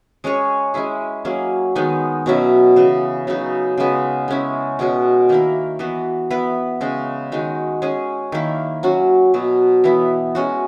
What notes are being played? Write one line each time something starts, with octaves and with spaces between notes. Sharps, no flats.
G#3 C#4 G#4 C#5
G#3 C#4 E4 G#4
F#3 A#3 C#4 G#4
D#3 G#3 B3 D#4
B2 F#3 C#4 E4
C#3 E3 B3
C#3 F#3 B3 D#4
C#3 G#3 B3
G#3 C#4 E4
B2 G#3 C#4 F#4
D#3 A#3 E4 A#4
E3 B3 F#4
B3 E4 B4
C#3 G#3 C#4
D#3 G#3 D#4 F#4
G#3 C#4 G#4
D#3 A#3 E4
F#3 C#4 F#4
B2 F#3 B3
E3 B3 E4
G#3 C#4 F#4